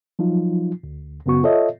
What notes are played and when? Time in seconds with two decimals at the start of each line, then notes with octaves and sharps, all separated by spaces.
0.19 F3 F#3 D#4 F4
0.84 D2
1.26 F#2 C#3 B3 F#4 C#6
1.43 F4 A4 C#5 D#5 E5